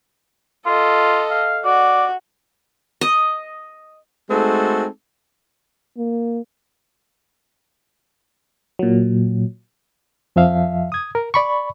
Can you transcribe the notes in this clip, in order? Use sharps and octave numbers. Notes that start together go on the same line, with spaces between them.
F4 A4 D#5
F5
F#4 D5
D#5
G#3 A3 C4 D#4 F#4 A4
A#3
A#2 F#3
F2 F3 E5 F5
D#6 G#6
A#4
D5 B5 C#6